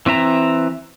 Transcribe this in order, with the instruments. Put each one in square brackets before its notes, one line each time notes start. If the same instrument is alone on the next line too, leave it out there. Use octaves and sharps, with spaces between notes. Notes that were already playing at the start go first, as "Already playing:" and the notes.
[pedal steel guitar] E3 C4 E5 A#5